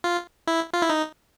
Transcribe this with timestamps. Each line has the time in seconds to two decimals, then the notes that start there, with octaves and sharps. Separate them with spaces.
0.04 F4
0.47 E4
0.74 F4
0.82 E4
0.90 D#4